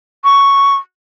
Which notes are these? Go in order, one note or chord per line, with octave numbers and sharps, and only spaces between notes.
C#6